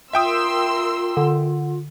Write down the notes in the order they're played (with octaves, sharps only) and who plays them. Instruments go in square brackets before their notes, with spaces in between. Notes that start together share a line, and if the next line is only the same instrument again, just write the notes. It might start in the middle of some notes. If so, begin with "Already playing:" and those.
[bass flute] F4 [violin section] A#4 C6 E6 [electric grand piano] E5 G5 D#6
[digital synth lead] D3